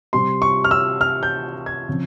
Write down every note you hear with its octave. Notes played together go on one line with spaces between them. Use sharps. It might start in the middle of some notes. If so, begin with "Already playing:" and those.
C3 G3 C4 C6
C#6
F6
E6
F6
G6
G#6
C#3 F3 C4